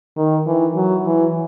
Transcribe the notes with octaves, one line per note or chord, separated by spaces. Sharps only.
D#3
E3
F#3
E3